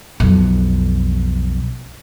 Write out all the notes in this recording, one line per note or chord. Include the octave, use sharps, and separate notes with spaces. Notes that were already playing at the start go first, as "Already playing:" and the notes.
B1 F2